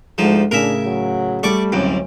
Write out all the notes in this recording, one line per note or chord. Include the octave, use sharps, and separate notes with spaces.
D2 G#2 F3
A2 C#3 D4 G#4 A#4 E5
F#3
G3 A3 D5 C#6 D6
D1 C2 F#2 C#4 D7